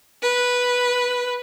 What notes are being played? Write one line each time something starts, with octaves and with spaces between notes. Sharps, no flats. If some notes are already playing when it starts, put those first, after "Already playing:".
B4